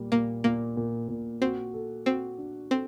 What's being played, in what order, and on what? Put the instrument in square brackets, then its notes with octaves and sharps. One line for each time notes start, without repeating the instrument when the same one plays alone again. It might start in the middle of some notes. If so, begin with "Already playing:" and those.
Already playing: [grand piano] A#2 G3
[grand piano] A#2 [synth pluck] A#3
[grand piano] A#2 [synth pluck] A#3
[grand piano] A#2
A#2
[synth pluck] C4 [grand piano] F#4
[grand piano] A4
[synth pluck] C4 [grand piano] F#4
[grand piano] D4
[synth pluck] C4 [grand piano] A4